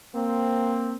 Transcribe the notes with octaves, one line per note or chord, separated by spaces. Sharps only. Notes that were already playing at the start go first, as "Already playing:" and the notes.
A#3 C4